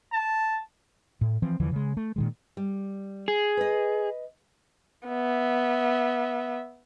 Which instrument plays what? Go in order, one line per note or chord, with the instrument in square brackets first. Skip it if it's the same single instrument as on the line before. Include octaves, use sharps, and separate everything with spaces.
[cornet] A5
[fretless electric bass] A2
E3 F3 C4
E2 D3 E3 F3
C#3 G#3
A3
A#2 D#3 G#3
[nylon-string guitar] G3
[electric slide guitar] G#4
[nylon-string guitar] B4 D#5
[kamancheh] B3 E5